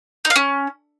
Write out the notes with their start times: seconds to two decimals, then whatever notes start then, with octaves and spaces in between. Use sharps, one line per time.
0.25 D#4
0.30 F5
0.36 C#4